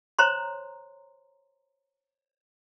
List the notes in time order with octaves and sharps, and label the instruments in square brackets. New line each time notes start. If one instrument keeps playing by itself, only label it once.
[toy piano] C5 C#5 A#5 C6